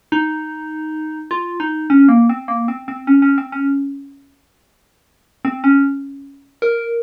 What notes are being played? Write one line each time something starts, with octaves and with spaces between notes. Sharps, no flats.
D#4
F4
D#4
C#4
A#3
C4
A#3
C4
C4
C#4
C#4
C4
C#4
C4
C#4
A#4